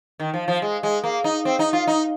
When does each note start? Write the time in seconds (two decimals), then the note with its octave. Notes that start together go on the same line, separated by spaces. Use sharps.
0.20 D#3
0.34 F3
0.48 F3
0.62 G#3
0.83 G#3
1.04 A#3
1.24 D#4
1.45 C4
1.59 D#4
1.73 F4
1.87 D#4